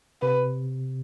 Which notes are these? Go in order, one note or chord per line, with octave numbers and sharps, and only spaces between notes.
C3 B4